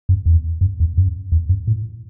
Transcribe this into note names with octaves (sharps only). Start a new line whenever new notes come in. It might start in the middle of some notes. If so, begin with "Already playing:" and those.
F#2
E2
F#2
E2
F#2
E2
F#2
A2